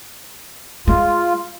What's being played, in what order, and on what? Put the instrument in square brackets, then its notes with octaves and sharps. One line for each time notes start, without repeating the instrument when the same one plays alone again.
[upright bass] G#3 [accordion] F4